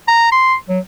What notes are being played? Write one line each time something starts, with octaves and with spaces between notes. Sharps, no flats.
A#5
C6
F#3